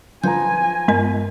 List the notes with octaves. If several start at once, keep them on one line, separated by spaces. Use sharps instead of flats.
F3 B4 G#5 A#5 G6
G2 G#3 B3 A#4